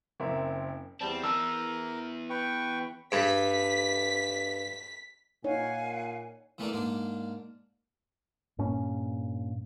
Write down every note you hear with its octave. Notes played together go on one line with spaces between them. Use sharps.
F#1 C4 A#4 E5
E2 G3 C4 A5
E3 B3 A#4 E6
B4 G5 C#6
G2 B6
A#2 D#4 C#5 F5 F#5 G#5
E3 A3 A#3 D4
G#2 A#3 D4
G2 A#2 A#3 C#4